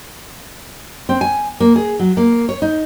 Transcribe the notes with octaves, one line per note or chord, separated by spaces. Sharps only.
C4
G#5
A#3
G#4
F#3
A#3
C#5
D#4